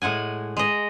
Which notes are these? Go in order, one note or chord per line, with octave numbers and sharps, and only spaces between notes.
A2 G#3 F#5 G#5
G#3 D#5